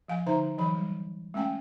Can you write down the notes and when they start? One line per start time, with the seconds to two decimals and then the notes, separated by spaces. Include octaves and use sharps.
0.08 F3 F5 G#5
0.26 D3 D#4 C5 E5 A#5
0.58 E3 F#3 B5
0.75 G3
1.34 G#3 A3 C#4 G5 G#5